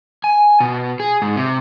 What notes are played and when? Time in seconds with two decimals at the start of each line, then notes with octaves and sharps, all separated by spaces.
0.24 G#5
0.60 B2
1.00 G#4
1.22 G#2
1.36 C3